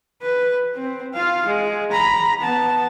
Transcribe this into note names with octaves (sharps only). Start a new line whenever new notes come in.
B4
C4
F4 F5
G#3
A#5 B5
B3 A5